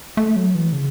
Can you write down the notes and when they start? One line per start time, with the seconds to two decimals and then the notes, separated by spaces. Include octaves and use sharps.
0.17 A3
0.36 F#3
0.55 E3
0.73 C#3